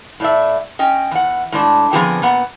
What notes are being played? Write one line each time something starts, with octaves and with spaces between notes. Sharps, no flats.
A2 D5 E5
C#4 D#5 G5
E2 F#5
A2 G#3 D4
D3 F3 B3 C4 G4 G#4
A#2 B3 F#5